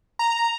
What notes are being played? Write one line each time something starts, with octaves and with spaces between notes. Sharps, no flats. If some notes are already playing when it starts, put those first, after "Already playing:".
A#5